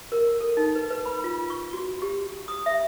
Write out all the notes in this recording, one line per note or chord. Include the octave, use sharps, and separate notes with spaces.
A#4
A4
D#4
B4
B4
B5
F4
C#6
F#4
G4
D#6
E5